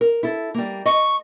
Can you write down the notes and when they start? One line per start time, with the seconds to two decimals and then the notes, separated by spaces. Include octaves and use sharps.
0.01 A#4
0.23 E4 A4
0.54 G3 A#3
0.86 D#5 C#6